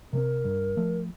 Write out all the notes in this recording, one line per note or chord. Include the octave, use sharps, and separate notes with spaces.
C3 G3 C4 A#4
G2
F3 A3